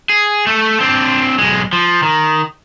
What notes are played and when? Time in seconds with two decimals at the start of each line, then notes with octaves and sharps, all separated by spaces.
0.09 G#4
0.47 A3 A4
0.80 C4 D4
1.38 B1 G#3
1.73 F3
2.03 D#3